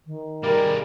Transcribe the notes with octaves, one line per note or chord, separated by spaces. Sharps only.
D#3
G3 G#3 A#3 A#4 D5